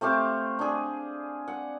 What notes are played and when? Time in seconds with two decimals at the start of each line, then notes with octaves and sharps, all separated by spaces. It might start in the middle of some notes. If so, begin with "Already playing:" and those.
0.01 A3 C4 G4 F5
0.59 D4 G#4
1.48 F#5